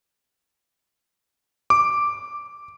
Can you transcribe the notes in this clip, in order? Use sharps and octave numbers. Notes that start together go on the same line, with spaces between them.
D6